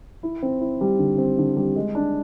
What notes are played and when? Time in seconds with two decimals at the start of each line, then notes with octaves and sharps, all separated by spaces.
0.23 E4
0.42 C4
0.61 E4
0.81 G3
0.99 D3
1.18 C4
1.38 D3
1.57 G3
1.76 G#3
1.95 D4